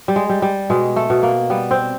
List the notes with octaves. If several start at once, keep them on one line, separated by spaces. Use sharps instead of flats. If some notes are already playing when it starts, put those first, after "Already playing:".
G3
G#3
G3
G3
B2 G#3
A3
B2
A#3
G3 B3
C4